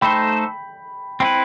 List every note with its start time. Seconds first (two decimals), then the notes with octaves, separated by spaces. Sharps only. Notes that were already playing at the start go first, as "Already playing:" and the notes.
0.01 A3 D#4 A4 C5 G5 B5
1.20 C4 E4 B4 G5 B5